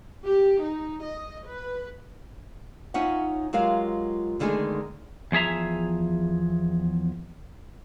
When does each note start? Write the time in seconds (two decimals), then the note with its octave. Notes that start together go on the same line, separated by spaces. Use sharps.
0.25 G4
0.62 D#4
1.02 D#5
1.46 B4
2.94 C#4 D#4 F4 C#5 E5 F#5
3.53 F#3 G#3 F4 G4 A#4 F5
4.39 E2 D3 D#3 G#3 A3 G#4
5.32 E2 F3 G#4 E5 A#5